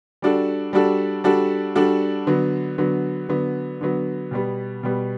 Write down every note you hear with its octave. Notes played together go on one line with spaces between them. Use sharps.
G3 D4 F#4 A4
G3 D4 F#4 A4
G3 D4 F#4 A4
G3 D4 F#4 A4
D3 F#3 B3
D3 F#3 B3
D3 F#3 B3
D3 F#3 B3
B2 G3 B3
B2 G3 B3